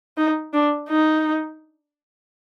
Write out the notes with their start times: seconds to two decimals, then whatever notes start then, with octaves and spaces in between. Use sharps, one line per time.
0.17 D#4
0.53 D4
0.89 D#4